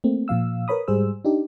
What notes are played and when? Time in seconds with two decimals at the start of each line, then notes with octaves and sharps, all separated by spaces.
0.04 A3 A#3 C4
0.28 A#2 F3 F5 E6
0.68 A#4 B4 C#5 B5 D#6
0.88 G#2 G3 G#4 C5 E6
1.25 D4 D#4 G4